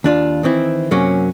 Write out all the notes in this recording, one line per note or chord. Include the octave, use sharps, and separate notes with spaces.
D#2 D4 F4
D#3 E3 C4 E4
F#2 C3 F#3 A#3 C#4